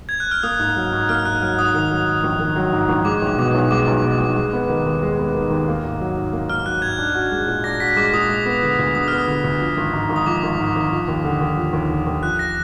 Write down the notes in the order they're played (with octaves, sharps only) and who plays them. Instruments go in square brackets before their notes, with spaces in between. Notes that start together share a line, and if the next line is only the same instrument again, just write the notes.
[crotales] G#6
F#6
F6
[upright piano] A#3 [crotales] D#6
[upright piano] G#2
F#3
G#2
[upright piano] A#3 [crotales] F6
[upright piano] G#2 [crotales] F#6
[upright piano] F#3 [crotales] F6
[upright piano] G#2 [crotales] D#6
[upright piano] D#3
F#3
G#2
A#1
D#3
F#3
G#2
A#1
[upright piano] G#3 [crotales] D6
[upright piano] B1 [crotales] D6
[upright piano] B2 [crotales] D6
[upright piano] B1
[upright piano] G#3 [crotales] D6
[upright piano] B1
B2
B1
G#3
B3
D#3
D#2
G#3
B3
D#3
D#2
A#3
G#2
F#3
G#2
A#3
[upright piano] G#2 [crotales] F6
[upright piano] F#3 [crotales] F#6
[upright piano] G#2 [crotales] G#6
[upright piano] D4
F#4
G#3
A#2
[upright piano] D4 [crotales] A#6
[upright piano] F#4 [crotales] B6
[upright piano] G#3 [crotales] D6
[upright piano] A#2 [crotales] D#6
[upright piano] G#3
B3
D3
D2
[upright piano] G#3 [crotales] D#6
[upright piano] B3 [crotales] F6
[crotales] D#6
[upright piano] D3
D2
F3
G#1
G#2
G#1
[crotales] D#6
[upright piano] F3 [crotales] D6
[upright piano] G#1
G#2
G#1
F3
D#2
D3
D#2
F3
D#2
D3
D#2
[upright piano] F3 [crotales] F#6
[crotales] A#6